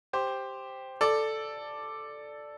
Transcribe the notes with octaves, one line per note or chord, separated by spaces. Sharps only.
G4 C5
A4 D5